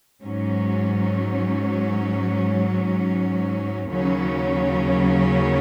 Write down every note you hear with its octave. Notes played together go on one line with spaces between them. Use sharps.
G#2 F#3 C#4
D#2 C#3 F#3 C#4